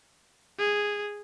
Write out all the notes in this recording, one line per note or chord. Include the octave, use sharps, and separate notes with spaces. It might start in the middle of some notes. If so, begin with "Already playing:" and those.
G#4